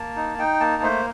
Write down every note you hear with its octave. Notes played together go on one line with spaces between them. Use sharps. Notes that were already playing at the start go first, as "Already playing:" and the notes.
Already playing: A#3 A5
D#4
D#4 G5
A#3 A5
A3 C5